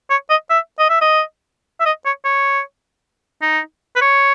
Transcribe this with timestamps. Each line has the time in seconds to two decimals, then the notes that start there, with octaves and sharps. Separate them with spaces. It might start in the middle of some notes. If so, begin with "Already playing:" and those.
0.10 C#5
0.30 D#5
0.50 E5
0.79 D#5
0.89 E5
1.01 D#5
1.80 E5
1.86 D#5
2.06 C#5
2.25 C#5
3.42 D#4
3.96 B4
4.01 C#5